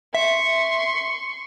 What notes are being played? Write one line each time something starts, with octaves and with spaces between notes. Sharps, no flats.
E5 C6 C#6